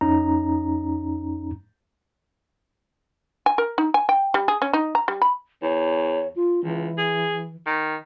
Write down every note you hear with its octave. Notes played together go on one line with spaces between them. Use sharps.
F2 C#4 D#4 A#5
G#5
A#4
D#4
G#5
G5
G3
G#4
C#4
D#4
A#5
G3
B5
E2 C#5
F4
C#2 E3
G#4
D#3